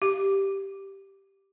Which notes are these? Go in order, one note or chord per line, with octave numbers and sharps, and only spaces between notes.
G4